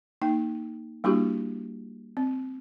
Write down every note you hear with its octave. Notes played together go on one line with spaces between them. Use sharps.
A#3 D#4 G5
G3 A#3 D4 E4 F#4 G4
C4